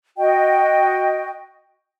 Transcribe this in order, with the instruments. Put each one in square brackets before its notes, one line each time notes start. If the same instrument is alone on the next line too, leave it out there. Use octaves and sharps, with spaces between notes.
[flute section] F#4 D#5 G5